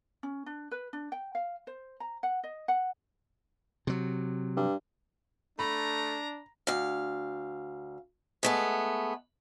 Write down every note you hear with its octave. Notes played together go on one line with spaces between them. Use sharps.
C#4
D4
B4
D4
G5
F5
C5
A#5
F#5
D#5
F#5
C3 F#3
G2
A3 D4 A#5 B5
D2 F5
G#3 A3 B3